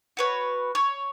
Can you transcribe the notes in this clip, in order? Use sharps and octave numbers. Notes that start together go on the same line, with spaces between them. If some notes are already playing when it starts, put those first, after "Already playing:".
F#4 B4 C#5
C#5